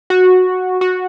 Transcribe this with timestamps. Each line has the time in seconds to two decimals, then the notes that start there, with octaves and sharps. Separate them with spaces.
0.10 F#4
0.81 F#4